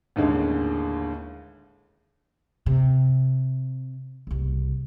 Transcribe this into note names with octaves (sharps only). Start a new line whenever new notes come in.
A1 D#2 D3 G#3
C3
F#1 C2